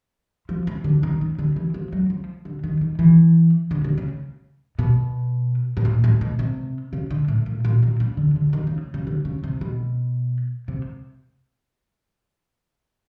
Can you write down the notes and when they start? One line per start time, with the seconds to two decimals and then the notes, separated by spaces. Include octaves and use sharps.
0.49 F3
0.67 E3
0.84 D3
1.03 D#3
1.21 C#3
1.39 D3
1.56 E3
1.74 F3
1.93 F#3
2.10 F3
2.45 D3
2.64 D#3
2.81 D#3
2.99 E3
3.71 D3
3.84 D3
3.98 C#3
4.79 B2
5.77 A2
5.85 A#2
6.04 A2
6.21 B2
6.39 C3
6.93 C#3
7.11 D3
7.28 A2
7.46 A#2
7.65 A#2
7.83 A#2
8.00 C#3
8.17 D3
8.36 D3
8.53 D#3
8.67 C#3
8.94 C#3
9.07 D3
9.25 C#3
9.44 C3
9.61 B2
10.68 C3